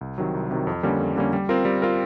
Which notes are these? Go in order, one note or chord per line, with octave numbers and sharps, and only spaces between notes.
C2
C3 D#3 F#3
C2
C3 D#3 F#3
F2
D3 G3 A#3 C#4
F2
D3 G3 A#3 C#4
G3
C4 F4 A#4
G3
C4 F4 A#4